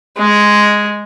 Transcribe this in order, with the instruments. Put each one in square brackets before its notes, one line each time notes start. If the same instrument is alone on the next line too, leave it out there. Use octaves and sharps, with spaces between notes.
[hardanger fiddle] G#3